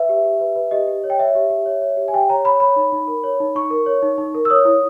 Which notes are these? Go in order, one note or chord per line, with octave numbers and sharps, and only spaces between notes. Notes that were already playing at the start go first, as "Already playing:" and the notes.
Already playing: B4 E5
G4
G4
B4
B4
G4 D#5
G4
C#5
G5
C#5 E5
G4
G4
C#5
C#5
G4
G#5
G4 G5
C#5 A#5
C#5 B5
C#5 B5
D#4
D#4
A#4
C#5
D#4
D#4 C#6
A#4
C#5
D#4
D#4
A#4
E6
C#5 D#6
E4